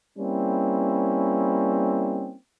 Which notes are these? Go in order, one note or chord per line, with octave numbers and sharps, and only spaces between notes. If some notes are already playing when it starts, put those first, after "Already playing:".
G3 A#3 C4 C#4 E4